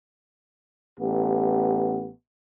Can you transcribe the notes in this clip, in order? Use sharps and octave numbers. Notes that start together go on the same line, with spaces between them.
A1 B3 G4